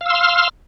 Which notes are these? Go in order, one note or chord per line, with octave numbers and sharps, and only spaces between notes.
F5 C6 E6 F6